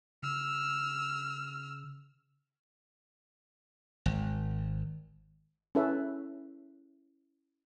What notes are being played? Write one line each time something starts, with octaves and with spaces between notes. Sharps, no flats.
C#3 E6 F6
G#1
C#4 E4 A4 B4 E5